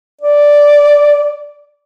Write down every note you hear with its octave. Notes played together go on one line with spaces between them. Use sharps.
D5